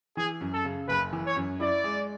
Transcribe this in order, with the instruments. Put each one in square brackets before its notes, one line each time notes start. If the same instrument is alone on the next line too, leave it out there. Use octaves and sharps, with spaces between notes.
[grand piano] E3 [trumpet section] G#4
[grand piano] F#2
[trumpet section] A4
[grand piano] C#3
[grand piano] F#1 [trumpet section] B4
[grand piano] E3
[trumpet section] C#5
[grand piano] F#2
[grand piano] E4 [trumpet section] D5
[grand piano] G#3